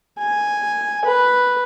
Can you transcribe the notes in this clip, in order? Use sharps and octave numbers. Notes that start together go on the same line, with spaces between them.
G#5
B4